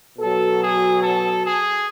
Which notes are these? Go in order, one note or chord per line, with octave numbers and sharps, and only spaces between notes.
B2 F#3 A4
G#4
A4
G#4